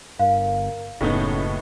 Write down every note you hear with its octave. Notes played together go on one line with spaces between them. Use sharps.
G1 A#4 F5
F#1 A2 B3 C#4 D#4